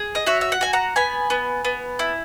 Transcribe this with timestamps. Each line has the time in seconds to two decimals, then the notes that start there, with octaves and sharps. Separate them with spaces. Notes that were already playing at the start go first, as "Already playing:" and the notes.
Already playing: G#4
0.15 D#5
0.26 F#4 C#5 E5
0.41 E5
0.52 F#5
0.61 F#4 G#5
0.73 F#5 A#5
0.96 B3 G#5 B5
1.30 B3
1.65 B3
1.99 E4